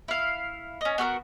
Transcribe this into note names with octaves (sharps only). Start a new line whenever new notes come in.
E4 F5
C#4 D#5
B3 F#4 A4 A#4